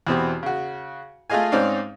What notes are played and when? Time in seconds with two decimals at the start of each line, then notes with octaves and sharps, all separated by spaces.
0.07 E2 B2 C4 G4
0.43 C#3 F#4
1.30 A3 F4 G#4 D#5 F5 G#5
1.52 G#2 C4 C#4 D#4 D5 F5